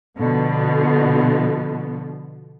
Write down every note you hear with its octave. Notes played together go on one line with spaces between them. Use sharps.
B2 D3 F3 B3